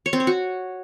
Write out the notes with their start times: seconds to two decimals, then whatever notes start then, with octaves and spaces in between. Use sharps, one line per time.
0.06 C#5
0.13 C4
0.20 C#5
0.27 F#4